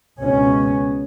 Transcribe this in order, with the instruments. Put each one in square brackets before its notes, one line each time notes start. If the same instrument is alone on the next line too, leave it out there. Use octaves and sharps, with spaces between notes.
[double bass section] C#2 B2 C#4